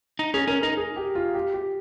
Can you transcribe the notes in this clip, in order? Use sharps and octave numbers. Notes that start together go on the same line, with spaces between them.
D#4
C#4 G#4
C#4 A#4
D#4 A#4
G#4
G4
F4
G4
G4